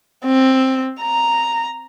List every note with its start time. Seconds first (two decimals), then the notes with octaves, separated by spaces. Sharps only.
0.25 C4
1.01 A#5